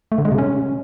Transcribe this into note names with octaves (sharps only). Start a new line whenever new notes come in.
A3
D3
G#3
C3
C#4